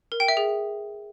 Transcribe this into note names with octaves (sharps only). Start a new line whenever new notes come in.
A#4
G5
E5
G#4